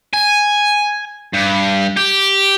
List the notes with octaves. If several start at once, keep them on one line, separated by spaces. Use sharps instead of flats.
G#5
G2
G4